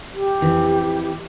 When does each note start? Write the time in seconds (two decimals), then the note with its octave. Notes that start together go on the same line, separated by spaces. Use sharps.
0.14 G4
0.41 F2 E3